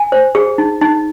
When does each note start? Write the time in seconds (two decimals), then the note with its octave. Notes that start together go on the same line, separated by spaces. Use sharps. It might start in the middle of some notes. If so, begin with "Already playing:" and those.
Already playing: G#5
0.12 C5
0.35 G#4
0.58 D#4
0.81 D#4